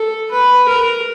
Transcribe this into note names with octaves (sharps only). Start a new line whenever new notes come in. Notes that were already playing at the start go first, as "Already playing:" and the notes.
Already playing: A4
B4
A#4